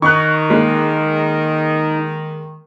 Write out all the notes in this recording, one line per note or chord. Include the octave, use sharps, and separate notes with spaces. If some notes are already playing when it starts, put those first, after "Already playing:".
D#3 D#4 C#6 F#6
G#3 A#3